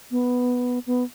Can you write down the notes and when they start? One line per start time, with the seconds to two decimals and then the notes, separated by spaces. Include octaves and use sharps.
0.11 B3
0.87 B3